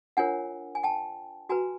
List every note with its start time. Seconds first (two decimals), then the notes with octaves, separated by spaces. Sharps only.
0.17 D4 F4 A#4 C#5 F#5 G#5
0.75 G#5
0.83 G5 A5
1.49 F#4 B4 G#5 A#5